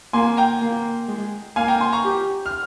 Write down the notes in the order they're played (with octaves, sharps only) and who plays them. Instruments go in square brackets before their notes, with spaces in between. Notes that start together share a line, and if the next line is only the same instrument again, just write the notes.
[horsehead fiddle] A#3 [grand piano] G#5 C6
[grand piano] G5 A#5
[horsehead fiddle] A#3
G#3
[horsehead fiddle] A#3 [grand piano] F5 G#5
[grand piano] G5 A#5
G#5 C6
A#5 C#6
[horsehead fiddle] G4
[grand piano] F6